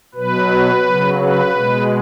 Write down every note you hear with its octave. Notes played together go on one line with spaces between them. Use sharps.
B2 F#3 B4
C#3 F#3
B4
B2 G#3